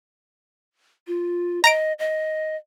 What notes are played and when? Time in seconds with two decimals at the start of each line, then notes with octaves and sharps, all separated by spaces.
1.07 F4
1.64 D#5 A#5 A#6 D7
1.99 D#5